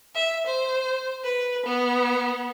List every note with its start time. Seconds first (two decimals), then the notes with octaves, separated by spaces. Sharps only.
0.14 E5
0.46 C5
1.23 B4
1.66 B3